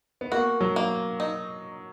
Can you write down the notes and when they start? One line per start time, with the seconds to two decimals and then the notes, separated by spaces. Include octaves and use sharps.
0.21 B3
0.32 A#3 F#4
0.61 F#3
0.76 A#3
1.20 D#4